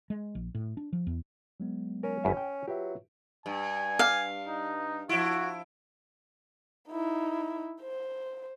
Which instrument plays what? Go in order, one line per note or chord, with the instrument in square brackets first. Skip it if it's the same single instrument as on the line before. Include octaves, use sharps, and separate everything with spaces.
[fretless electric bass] G#3
A#1
A2
D4
F3
E2
[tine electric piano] F#3 G#3 B3
[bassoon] C#4 [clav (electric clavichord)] A#4
[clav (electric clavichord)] G1 F#2 E5
G5
[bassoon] F#3 [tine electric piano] F4 B4 E5 [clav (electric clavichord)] G4
[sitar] G2 [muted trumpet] G#5
[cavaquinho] F5
[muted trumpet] D#4
[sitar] F3 E4 [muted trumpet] F#4
[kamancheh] D#4 E4
C5